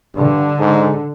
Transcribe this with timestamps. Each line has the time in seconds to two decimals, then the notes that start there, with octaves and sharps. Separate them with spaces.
0.16 G2 D3
0.59 G#2